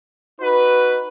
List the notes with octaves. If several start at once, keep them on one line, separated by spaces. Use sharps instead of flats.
D#4 F#4 B4